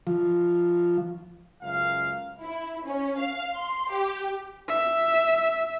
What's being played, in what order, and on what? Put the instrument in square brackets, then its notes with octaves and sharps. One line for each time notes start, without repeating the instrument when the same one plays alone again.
[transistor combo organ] F3
[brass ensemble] C#2 F#2 F5
[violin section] E4
C#4
F5
C6
G4
[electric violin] E5